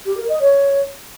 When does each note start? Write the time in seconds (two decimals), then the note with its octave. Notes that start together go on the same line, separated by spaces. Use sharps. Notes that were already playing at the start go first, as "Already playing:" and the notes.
0.06 G4
0.17 A#4
0.29 D#5
0.40 C#5